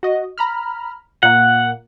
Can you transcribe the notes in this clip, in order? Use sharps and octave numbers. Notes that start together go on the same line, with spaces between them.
F#4 D#5
A#5 B5 F6
A#2 A#3 F#5